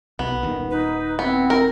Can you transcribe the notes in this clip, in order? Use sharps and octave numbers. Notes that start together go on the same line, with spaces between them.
B1 B3
D#1 D#3
D#4 B4
B3 C4 E4
A#4